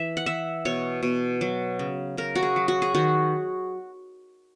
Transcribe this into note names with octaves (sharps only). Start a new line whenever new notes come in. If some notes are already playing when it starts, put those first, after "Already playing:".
Already playing: E3 E5
F#5
E3 E5
B2 C#5
B2
F#3
C#3
C#3 A#4
F#4
G#4
F#3
F#4
G#4
D#3 F#4